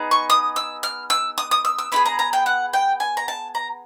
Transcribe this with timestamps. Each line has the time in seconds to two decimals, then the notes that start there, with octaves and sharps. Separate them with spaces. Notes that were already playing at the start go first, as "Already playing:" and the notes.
Already playing: B3 D#4 G#4
0.11 C#6
0.30 D#6
0.56 E6
0.83 F6
1.10 E6
1.38 D#6
1.51 D#6
1.65 E6
1.78 E6
1.92 B3 E4 G#4 B5
2.06 A#5
2.19 A#5
2.33 G5
2.46 F#5
2.73 G5
3.00 G#5
3.17 A#5
3.28 A5
3.55 A#5